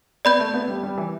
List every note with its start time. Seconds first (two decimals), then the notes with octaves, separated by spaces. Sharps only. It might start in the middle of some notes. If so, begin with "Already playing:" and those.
0.25 B3 D5 B5 G6
0.39 A3
0.54 B3
0.68 G3
0.83 G3
0.98 E3